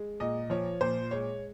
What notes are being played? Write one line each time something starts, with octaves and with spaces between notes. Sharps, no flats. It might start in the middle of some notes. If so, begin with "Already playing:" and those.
Already playing: G#3
A#2 D#5
F3 C#5
A#2 C5
G#3 C#5